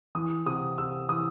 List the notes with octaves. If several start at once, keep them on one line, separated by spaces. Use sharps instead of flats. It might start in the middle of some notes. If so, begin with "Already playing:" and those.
E3 D#6
C3 D#6
C3 E6
E3 D#6